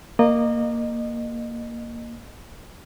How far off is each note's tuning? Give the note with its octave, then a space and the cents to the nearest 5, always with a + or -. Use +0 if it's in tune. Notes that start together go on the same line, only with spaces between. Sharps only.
A#3 +0 D#5 -30